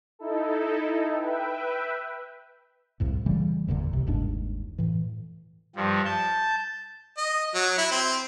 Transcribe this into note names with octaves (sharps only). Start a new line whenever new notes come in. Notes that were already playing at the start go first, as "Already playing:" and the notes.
D#4 E4 A4
B4 E5 G5
C2 F2 A2
C#3 E3 G3 A3
G1 E2 A#2 D3
C2 C3
G1 D#2 G#2 D4
A2 E3
G2 F3 G3
A5 G6
D#5
F#3
E4
C4